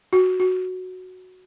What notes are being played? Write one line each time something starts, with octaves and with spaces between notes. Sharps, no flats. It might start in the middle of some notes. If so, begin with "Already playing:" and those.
F#4
F#4